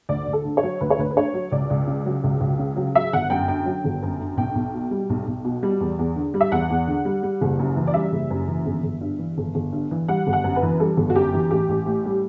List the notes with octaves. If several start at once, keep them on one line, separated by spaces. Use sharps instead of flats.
D2 D5
D2
A4
D3
C#5
F#3
D2 B4
C#5
D2 B4
B4
D3 C#5
F#3
C#2 D5
C#2
C#3
F#3
C#2
C#2
C#3
F#3
F#3 E5
G1 F#5
F#2 G5
D3 G5
F#3
G1
F#2
D3
B1 G5
B1
B2
G3
B1
B1
B2
G3
E2
E2
D3
G3
E5
E2 F#5
E2
D3
G3
G3
F#1
F#2
E3
D5
G3 E5
F#1
F#2
E3
G1
G1
G2
E3
G1
G1
G2
E3
G3 F#5
G1
F#5
F#2
B4
E3
G3 A4
G1
F#4
F#2 G4
E3
A1 G4
A1
A2
G3